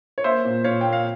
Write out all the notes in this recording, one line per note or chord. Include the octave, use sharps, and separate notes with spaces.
C#5
A#3 C5 E5
A#2
A#2 C#5 F5
A#3 G5
F5